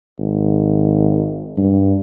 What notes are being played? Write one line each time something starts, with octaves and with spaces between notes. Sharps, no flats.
G#1
G2